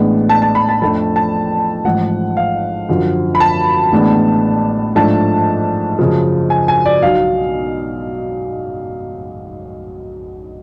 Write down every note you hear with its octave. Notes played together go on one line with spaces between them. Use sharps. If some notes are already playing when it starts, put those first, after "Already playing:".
Already playing: A1 A2 G#3 B3 D4
A5
A5
B5
A5
F2 F3 A3 D4 A5
A5
A1 G#2 F3 F#5
F5
F#2 D3 F3
B5
A5
A1 A2 G#3 B3 D4
G#2 F3 A3 D4 A5
F#2 C#3 F3
G#5
G#5
D5
B1 B2 F#3 F5